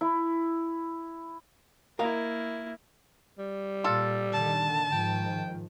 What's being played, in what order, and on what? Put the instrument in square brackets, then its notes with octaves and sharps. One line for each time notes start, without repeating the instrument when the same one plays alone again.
[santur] E4
[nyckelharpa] A#3 E4 [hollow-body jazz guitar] A#4 D#5 F5
[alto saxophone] G3
[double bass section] A#2 [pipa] F4 A4
[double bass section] A#2 D3 D#3 [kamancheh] A5
[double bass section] G#2 D#3 F3 [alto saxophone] G5